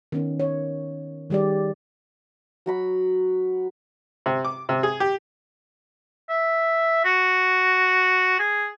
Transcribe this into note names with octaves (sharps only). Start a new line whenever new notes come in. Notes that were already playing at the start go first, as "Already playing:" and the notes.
D#3 B3 C#4
C#5
D#3 G3 G4 G#4 D5
F#3 F#4 B5
C3
D6
C3
G#4
G4
E5
F#4
G#4